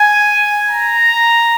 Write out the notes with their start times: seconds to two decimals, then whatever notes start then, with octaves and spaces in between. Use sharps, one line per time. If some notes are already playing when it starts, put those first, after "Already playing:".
Already playing: G#5
0.70 A#5